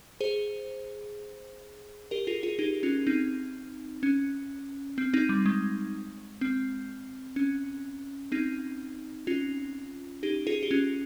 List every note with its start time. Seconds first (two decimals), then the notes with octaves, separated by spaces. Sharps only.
0.20 G#4 C5
2.11 G4 A#4
2.27 F4 G#4
2.43 F4 G#4
2.59 D#4 G4
2.83 C#4 F4
3.06 C4 D#4
4.03 C#4
4.98 C4
5.13 C4 D#4
5.29 G3
5.46 G#3
6.41 C4
7.36 C#4
8.32 C4 D#4
9.27 C#4 F4
10.23 D#4 G4
10.47 F4 G#4
10.63 G4
10.71 C#4 F4